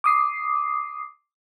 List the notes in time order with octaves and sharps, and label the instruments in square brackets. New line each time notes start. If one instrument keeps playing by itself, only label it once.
[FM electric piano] D6 D#6 C7